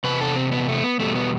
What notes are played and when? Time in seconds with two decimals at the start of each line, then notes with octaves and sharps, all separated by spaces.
0.04 E2 C3 B4
0.21 A4
0.36 C4
0.52 B3
0.68 A3
0.84 B3
0.99 E2 B2 G3 A3
1.16 B3